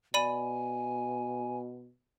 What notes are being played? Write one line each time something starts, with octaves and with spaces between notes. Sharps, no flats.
B2 D5 G#5 B5 D#7